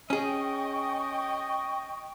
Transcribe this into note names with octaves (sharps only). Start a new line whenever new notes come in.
C#4 G#4 D#5 G5 C#6